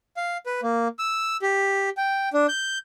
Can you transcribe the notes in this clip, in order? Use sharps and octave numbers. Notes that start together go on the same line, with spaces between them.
F5
B4
A#3
E6
G4
G5
D4
G6